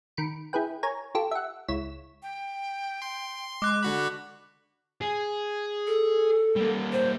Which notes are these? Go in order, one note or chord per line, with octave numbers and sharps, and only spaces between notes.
D#3 B5 C#7 D7
E4 G#4 B4 G5
A#4 C#5 G#5 A#5
F4 G4 A4
E5 F#5
C#2 E4 C#5 B6 E7
G5
C6
G#3 D6 F#6
D3 F#4 B5
G#4
A4
G3 A#3
C5